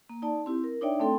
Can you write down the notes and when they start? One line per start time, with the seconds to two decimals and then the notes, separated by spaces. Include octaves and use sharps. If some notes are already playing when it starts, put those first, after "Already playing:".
0.09 A#3
0.22 D#4 D5 A5
0.46 C4 E4 G4
0.64 A#4
0.81 D4 D#4 C#5 D5 E5 G5
1.00 A3 C4 A4 G5 C6